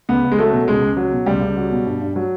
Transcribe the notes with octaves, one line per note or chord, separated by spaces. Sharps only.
C#2 B3
C#2
G#3
F#3 A3
B2
C#2 G#3
C#2
F#3
B2
C#2 G3
C#2
F#3
B2
G2
G2
F#3